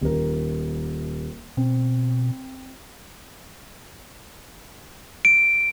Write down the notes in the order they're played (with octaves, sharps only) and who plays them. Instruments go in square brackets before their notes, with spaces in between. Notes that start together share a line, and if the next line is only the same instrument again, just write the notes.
[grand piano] D#1 A#4
[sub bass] B2 [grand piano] C4
[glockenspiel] D7